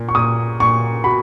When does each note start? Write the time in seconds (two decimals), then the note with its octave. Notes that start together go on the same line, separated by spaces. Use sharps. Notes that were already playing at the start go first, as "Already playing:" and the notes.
Already playing: A#2
0.09 C#6
0.15 A#2 D#6
0.60 A#2 C#6
1.04 F#4 B5